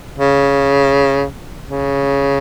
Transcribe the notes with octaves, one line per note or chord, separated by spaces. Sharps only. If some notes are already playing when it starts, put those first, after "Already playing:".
C#3
C#3